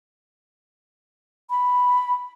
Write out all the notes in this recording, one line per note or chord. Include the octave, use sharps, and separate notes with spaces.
B5